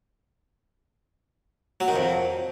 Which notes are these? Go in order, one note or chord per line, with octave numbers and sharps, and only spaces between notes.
F#3
D#3
F2